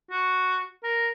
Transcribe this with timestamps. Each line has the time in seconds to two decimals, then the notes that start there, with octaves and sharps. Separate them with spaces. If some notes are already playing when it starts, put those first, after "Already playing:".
0.11 F#4
0.84 A#4